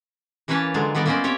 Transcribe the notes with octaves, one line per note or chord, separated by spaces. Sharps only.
E3 A#3 C#4 B4 C#5 A5
D3 F#3 G#3 F4
D#3 G3 B3 D5 D#5
A#3 B3 C#4 C5 D5 D#5
C4 G4 C#5 G5